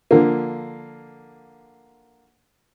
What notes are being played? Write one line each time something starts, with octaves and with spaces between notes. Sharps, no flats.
D3 F3 A#3